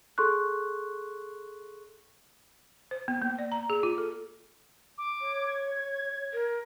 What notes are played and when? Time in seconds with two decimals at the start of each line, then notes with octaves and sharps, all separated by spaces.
0.18 G#4 A4 C6 C#6 F#6
2.91 C5
3.08 B3
3.22 A#3
3.39 D5
3.52 A#5
3.70 G#4
3.83 F4
3.98 A4
4.98 D6
5.21 C#5
5.47 G#6
6.33 A#4